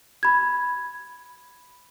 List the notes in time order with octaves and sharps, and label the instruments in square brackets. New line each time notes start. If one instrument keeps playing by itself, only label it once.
[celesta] B5 G#6